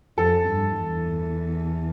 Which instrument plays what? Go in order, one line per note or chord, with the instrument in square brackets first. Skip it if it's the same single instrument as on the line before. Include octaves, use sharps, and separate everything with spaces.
[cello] F2 [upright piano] A4
[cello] G2
E2